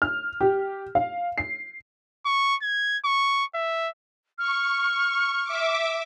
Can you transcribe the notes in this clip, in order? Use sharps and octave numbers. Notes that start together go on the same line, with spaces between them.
F6
G4
F5
C7
C#6
G#6
C#6
E5
C#6 F6
E5 D6